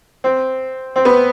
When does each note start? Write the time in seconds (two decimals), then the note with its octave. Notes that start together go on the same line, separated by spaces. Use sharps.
0.24 C4
0.96 C4
1.05 B3